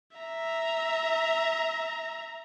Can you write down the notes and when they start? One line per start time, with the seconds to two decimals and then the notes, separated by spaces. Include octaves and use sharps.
0.17 E5 A#5